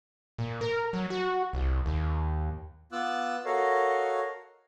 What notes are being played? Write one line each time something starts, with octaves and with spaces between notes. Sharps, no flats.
A#2
A#4
F#3
F#4
C2
D#2
B3 F4 D6 E6 F#6
F#4 A4 A#4 C#5 D#5 F5